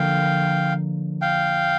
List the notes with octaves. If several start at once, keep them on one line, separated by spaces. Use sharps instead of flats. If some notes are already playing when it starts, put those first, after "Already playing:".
Already playing: D3 F3 A#3 F5 G5
F5 G5